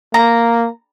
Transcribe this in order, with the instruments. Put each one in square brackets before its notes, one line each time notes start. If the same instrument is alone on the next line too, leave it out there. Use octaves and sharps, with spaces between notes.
[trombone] A#3 [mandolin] A#5